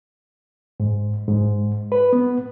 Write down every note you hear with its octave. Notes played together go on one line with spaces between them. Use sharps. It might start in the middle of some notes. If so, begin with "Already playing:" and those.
G#2
G#2
B4
B3